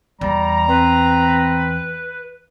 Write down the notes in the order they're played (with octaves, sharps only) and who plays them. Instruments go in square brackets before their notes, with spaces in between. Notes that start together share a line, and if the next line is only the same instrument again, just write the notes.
[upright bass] E2 [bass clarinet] G3 [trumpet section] A#5
[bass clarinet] C4 [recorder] B4